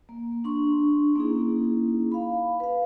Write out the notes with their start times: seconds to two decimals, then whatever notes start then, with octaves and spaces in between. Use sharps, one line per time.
0.09 A#3
0.44 D4 C6 C#6
1.16 A#3 C#4 D#4 E4 G#4
2.12 F5 B5
2.60 B4 F5